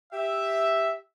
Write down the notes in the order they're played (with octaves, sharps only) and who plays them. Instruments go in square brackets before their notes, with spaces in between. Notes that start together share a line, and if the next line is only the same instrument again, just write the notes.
[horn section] G4 E5